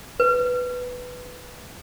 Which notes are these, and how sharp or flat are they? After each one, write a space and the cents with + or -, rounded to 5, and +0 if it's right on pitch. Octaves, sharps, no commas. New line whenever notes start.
B4 +5